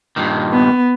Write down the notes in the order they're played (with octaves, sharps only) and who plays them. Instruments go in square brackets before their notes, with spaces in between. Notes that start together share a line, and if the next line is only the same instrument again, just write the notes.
[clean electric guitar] G2 A#2 D#3
[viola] B3